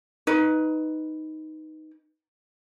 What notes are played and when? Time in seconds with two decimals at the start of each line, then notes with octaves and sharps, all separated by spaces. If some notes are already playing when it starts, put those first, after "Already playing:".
0.27 D#4 B4